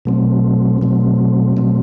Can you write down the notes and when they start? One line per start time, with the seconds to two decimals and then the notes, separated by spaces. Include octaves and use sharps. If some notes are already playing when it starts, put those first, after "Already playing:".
0.05 B2 F#3 A3 C4
0.82 B2 F#3 A3 C4
1.57 B2 F#3 A3 C4